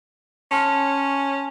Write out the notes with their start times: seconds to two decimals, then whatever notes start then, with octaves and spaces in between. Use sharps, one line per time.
0.51 C#4 A5 C6 F6